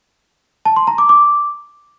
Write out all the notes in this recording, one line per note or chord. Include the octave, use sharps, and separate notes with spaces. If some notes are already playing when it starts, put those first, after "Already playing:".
A5
C6
A#5
D6
D6